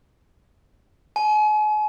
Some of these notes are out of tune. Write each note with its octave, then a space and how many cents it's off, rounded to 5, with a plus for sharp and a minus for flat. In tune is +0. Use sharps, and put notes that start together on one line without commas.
G#5 +40